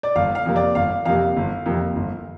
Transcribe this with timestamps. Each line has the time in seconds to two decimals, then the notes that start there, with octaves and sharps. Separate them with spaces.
0.03 D5
0.16 G1 F5
0.35 F5
0.45 F2 C3 A#3
0.56 D5
0.75 G1 F5
1.05 F2 C3 A#3 F5
1.37 G1
1.66 F2 C3 A#3
1.96 G1